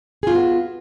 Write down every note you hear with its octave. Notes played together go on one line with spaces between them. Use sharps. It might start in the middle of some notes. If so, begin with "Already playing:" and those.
B3 F4 F#4 G#4